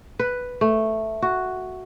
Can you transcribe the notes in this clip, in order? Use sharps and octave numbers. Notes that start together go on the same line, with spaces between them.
B4
A3
F#4